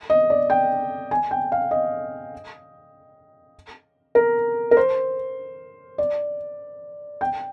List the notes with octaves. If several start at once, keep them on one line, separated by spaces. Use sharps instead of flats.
D#5
D5
G5
G#5
G5
F5
D#5
A#4
A#4
C5
D5
G5